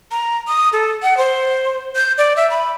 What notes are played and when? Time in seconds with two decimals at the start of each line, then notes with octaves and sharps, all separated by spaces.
0.11 A#5
0.48 D#6
0.73 A4
1.03 F#5
1.17 C5
1.96 G6
2.18 D5
2.36 E5
2.50 B5